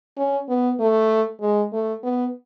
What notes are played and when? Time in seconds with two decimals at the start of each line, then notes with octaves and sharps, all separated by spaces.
0.17 C#4
0.49 B3
0.80 A3
1.41 G#3
1.73 A3
2.03 B3